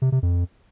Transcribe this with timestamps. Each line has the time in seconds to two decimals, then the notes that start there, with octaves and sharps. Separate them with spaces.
0.02 C3
0.12 C3
0.23 F2